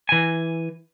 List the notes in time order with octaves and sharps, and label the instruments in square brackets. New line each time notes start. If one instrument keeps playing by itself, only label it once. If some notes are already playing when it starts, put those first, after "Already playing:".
[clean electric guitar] E3 G#5